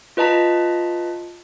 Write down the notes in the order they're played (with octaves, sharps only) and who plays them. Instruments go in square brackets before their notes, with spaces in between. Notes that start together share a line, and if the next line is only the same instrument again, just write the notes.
[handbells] F4 B4 D#5 A5 A#5 B6